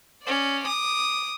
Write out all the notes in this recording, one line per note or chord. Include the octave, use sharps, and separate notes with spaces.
C#4 D5
D6 D#6